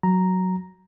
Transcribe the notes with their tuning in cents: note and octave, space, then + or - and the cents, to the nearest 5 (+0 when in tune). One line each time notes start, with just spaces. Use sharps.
F#3 +0 A#5 +0